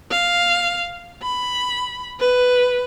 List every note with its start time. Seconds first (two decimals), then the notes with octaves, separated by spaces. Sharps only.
0.11 F5
1.23 B5
2.20 B4